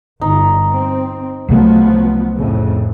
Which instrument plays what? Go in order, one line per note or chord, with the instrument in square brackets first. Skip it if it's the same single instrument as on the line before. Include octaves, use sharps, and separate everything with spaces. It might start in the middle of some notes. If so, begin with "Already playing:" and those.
[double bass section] G1 [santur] D#4
[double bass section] C4
[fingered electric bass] C2 C3 A3 [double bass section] F3 F#3 B3
[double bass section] F2 A2 C#3